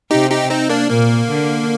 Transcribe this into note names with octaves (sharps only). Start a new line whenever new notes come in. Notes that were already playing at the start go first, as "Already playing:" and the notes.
C3 D#4 G4
D#4 G4
C4 D#4
A#3 D4
A#2 A#3
D3